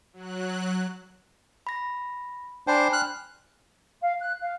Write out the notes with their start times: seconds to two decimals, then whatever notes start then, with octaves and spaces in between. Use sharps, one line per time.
0.13 F#3 F#6
1.67 B5 A#6
2.67 D4 C5 G5 G#5 B5
2.93 F6 F#6
4.01 F5
4.18 F#6
4.40 F5